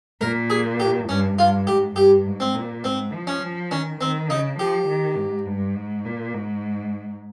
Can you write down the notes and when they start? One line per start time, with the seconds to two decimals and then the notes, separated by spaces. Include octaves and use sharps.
0.21 A#2 A#4
0.50 G#4
0.80 G4
1.09 G2 C#4
1.38 G2 F4
1.67 G#2 G4
1.96 G2 G4
2.26 G#2
2.40 C4
2.55 A#2
2.84 G#2 C4
3.13 F3
3.27 C#4
3.42 F3
3.71 D#3 C#4
4.01 D#3 C4
4.30 C#3 D#4
4.59 F3 G4
4.88 D#3
5.17 G#2
5.46 G2
5.76 G#2
6.05 A#2
6.34 G#2